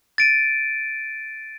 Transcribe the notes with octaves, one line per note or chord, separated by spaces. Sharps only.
A6 D7 D#7